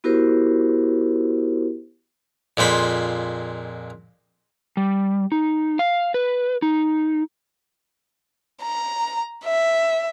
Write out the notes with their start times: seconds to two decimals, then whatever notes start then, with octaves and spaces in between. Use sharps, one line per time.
0.04 B3 E4 F#4 G4 A#4 C5
2.57 F2 A#2 G#3 C5 B5
4.77 G3
5.32 D#4
5.79 F5
6.14 B4
6.62 D#4
8.62 A#5
9.45 E5